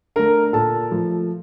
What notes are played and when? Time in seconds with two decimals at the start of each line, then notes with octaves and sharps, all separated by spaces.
0.16 D3 A3 A#4 A#5
0.53 A#2 A4 A5
0.91 F3 A3